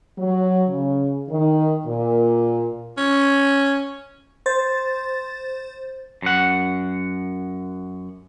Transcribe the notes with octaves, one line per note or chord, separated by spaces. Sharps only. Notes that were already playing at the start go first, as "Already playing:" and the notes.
F#3
C#3
D#3
A#2
C#4
C5 A6
F#2 F#5